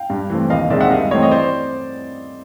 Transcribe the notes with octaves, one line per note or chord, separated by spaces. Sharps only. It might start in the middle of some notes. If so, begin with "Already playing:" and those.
Already playing: F5 G5
G2
E3 A3 C4
D#2 D#5 F5
D#3 G#3 C4 D5 E5
E5 F#5
G2 D#5 F5
E3 A3 C4 C#5 D#5
D#5
C5 D5